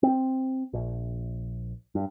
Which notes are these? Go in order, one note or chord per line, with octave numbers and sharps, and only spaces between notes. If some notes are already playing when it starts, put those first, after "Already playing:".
C4
A#1
G2